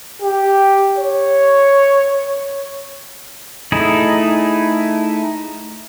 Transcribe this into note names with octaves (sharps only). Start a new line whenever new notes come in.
G4
C#5
A3 D#4 E4 G#4